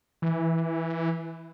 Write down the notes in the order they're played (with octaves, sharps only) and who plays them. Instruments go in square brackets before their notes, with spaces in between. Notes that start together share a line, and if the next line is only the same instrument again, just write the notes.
[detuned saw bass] E3